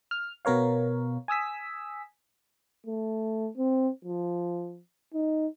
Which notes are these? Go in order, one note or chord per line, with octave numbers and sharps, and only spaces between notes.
F6
B2 B3 A#4 C#5 F5
G#5 D#6 E6 B6
A3
C4
F3
D#4